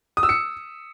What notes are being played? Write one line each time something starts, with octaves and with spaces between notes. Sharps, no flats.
D#6
E6
C#7